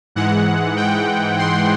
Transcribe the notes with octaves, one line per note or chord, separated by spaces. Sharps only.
G#2 E3 G#3 F#5
G5
C6